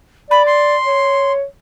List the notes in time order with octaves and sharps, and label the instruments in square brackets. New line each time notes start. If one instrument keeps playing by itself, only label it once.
[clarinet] D5 [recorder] B5
[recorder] C6
[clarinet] C#5